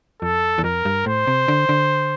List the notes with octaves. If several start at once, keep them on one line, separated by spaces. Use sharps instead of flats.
F2 A4
E2
F2 A#4
G2
A2 C5
C3
D3
D3